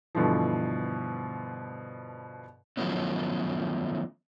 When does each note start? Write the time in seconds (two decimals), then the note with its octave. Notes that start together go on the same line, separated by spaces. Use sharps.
0.15 G2 B2 D3 E3 F3
2.77 D#3 F3 F#3 A3 B3 C#4